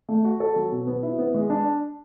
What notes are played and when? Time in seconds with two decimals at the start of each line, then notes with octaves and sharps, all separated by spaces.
0.09 A3
0.24 F#4
0.40 A4
0.56 F#3
0.72 B2
0.87 B3
1.03 E4
1.19 B3
1.34 G#3
1.50 D4